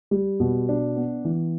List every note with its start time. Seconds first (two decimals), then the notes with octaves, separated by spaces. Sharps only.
0.11 G3
0.40 B2
0.69 D4
0.96 B3
1.25 E3